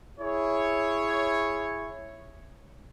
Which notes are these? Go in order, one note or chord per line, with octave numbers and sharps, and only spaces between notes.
E4 G#4 C#5